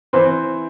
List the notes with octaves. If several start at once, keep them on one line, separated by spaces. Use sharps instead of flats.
E3 C4 C5